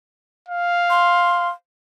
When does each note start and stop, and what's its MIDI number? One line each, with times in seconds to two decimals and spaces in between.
0.48 1.53 77
0.90 1.49 84